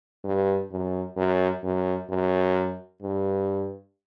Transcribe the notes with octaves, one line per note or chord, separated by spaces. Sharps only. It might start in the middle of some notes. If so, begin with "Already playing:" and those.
G2
F#2
F#2
F#2
F#2
G2